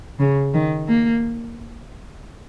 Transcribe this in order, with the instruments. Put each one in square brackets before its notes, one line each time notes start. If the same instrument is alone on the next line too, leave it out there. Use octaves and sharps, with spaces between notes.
[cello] C#3
D#3
A#3